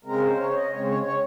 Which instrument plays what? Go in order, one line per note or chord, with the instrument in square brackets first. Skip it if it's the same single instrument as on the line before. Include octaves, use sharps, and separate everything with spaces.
[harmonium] C#3 G#3 C4 A#4
C5
C#5
D#5
C#3 G#3 C4 C#5
C#5
C#5